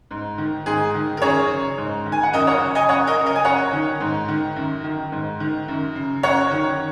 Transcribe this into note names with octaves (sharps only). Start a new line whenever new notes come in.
G#2
D#3
G#2 G#4
D#3
A#4
F#2 G#4 C#5
C#3
G#2
D#3
G#5
F#5
F#2 A#4 D#5
C#5 F#5
C#3
D#5 G#5
F#2 C#5 F#5
A#4 D#5
C#3
A#4 D#5
G#5
F#2 C#5 F#5
D#3
G#2
D#3
F#2
D#3
G#2
D#3
F#2
C#3
F#2 C#5 F#5
D#3